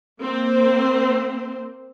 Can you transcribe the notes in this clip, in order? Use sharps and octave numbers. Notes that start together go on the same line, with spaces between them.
A#3 C4 C5